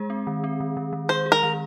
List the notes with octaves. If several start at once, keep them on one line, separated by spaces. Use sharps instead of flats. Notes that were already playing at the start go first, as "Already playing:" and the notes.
Already playing: G#3 G#4
C4
D#3
C4
D#3
D#3
D#3
G#4 C5
G#4
A#4
D#3